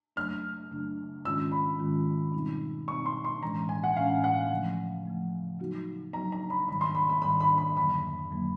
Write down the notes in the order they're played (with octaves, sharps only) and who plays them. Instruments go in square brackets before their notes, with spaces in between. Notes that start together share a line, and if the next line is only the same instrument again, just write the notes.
[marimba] F#2 C#3 F#3 A3 D4 [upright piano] F6
[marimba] F#2 C#3 F#3 A3 D4
[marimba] G#2 D#3 G#3 C#4 F4 [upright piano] E6
[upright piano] B5
[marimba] G#2 D#3 G#3 C#4 F4
B2 G3 C4 D#4
[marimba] B2 G3 C4 D#4 [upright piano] C#6
[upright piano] C6
C6
[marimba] A2 E3 G#3 C#4 [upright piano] A#5
[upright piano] G#5
F#5
[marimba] A2 E3 G#3 C#4 [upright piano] F5
[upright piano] F#5
[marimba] C#3 F3 A3
C#3 F3 A3
C#3 F#3 B3 D#4 F#4
[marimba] C#3 F#3 B3 D#4 F#4 [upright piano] A#5
[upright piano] A#5
B5
[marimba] G#2 D#3 G3 [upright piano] B5
[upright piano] C6
B5
B5
[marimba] G#2 D#3 G3 [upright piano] B5
[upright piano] B5
B5
[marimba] F2 D3 F#3 A#3 [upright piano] B5
[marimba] F2 D3 F#3 A#3